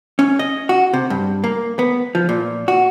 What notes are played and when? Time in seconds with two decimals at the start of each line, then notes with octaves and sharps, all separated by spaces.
0.19 C#4
0.39 D#5
0.69 F#4
0.94 C3
1.10 G2
1.44 A#3
1.79 B3
2.15 F3
2.29 A#2
2.68 F#4